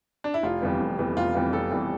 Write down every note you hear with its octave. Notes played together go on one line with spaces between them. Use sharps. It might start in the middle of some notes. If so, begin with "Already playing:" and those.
D4
E4
F1 F4
F2 E3 G3 B3
F1
F2 E3 G3 B3
F1 F4
F2 E3 G3 B3 F4
F1 A4
F2 E3 G3 B3